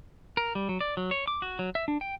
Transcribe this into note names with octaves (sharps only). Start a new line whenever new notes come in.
A#4
G3
F#3
D5
F#3
C#5
D6
F#4
F#3
E5
D4
G5